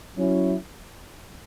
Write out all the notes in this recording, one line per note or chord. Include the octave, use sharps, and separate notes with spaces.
F#3 C#4 E4